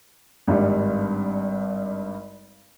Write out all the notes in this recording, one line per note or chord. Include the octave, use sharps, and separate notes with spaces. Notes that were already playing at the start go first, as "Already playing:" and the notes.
G#1 G2 G3